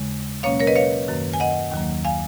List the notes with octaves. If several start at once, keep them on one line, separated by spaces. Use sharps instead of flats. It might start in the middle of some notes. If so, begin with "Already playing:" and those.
Already playing: D#2 C#3 G#3
B2 F#3 A#3 C#4 C#5 F5
A#4 C#5
B4 D#5
C#5 F5
F#2 D#3 A#3
G#5
D#5 F#5
D#2 D#3 F#3 A#3
F5 G#5